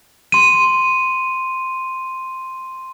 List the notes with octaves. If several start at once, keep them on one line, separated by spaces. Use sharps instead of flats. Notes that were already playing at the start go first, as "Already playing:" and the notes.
C6 D#7